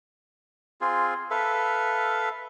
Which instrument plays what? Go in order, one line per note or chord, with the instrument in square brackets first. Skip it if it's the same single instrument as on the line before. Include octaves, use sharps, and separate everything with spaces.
[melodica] C4 F4 G#4
A4 B4 E5 F5